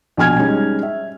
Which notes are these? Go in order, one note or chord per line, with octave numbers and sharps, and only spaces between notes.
A#1 B2 G#5 F6 G#6
G3 G#3 C#4 D#4
E5